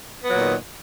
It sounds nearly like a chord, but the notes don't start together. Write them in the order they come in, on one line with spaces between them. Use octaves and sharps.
B3 F#3 A#2 D#3